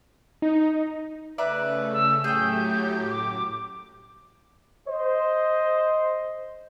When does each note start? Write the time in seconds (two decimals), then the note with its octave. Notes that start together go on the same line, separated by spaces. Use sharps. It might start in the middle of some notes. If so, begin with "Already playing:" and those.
0.42 D#4
1.38 C#3 A3 B4 D5 E5 A#5
1.94 E6
2.24 A2 F#3 A3 G4 G#4 G5 G6
3.10 F#2 D6
4.89 C5 D#5